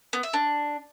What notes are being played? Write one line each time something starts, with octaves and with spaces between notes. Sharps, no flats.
B3
E5
D4